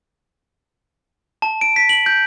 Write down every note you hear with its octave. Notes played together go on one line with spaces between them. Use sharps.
A5
D7
B6
F#7
G6